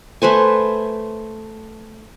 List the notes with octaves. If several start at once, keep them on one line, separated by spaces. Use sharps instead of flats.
A3 B4 C5 G#5